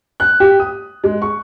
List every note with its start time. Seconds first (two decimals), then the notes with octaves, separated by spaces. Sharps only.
0.20 F#6
0.40 G4
0.60 D#6
1.04 G#3
1.22 C#6